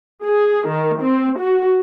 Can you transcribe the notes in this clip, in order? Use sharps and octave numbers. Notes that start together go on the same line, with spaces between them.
G#4
D#3
C4
F#4